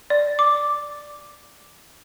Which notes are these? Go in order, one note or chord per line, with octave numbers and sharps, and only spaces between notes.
D5
D6